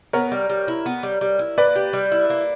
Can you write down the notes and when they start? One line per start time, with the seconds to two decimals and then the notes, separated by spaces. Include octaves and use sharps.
0.13 B3 A#4 C#5
0.31 G3
0.49 G3
0.68 E4
0.86 B3
1.03 G3
1.21 G3
1.39 E4
1.58 A#3 B4 D5
1.76 G4
1.93 G3
2.11 E4
2.30 A#3